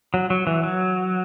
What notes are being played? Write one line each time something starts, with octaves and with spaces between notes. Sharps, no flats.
F#3
F#3
E3
F#3